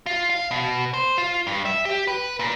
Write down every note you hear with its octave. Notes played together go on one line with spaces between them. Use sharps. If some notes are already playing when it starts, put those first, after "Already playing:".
F4
F5
B2
C5
F4
G2
E5
G4
B4
A#2